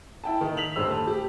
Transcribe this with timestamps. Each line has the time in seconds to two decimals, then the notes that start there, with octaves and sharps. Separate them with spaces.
0.24 E4 G5 A5
0.41 D#3
0.57 B6 F7 F#7
0.76 D#1 G2 C5 E6
0.88 A3 A5
1.07 G4